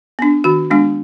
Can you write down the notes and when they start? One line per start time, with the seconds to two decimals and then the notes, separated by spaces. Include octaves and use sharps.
0.19 B3 D4
0.44 D#3 F#4
0.71 G#3 B3 D4